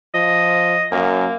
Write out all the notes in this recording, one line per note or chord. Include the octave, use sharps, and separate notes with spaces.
F3 D#5
F#2 A#3